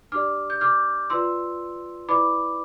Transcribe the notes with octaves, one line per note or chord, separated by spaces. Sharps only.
D4 G4 D5 D6 F6
G6
D6 F6
F4 B4 D5 C6 E6
E4 B4 D5 B5 D6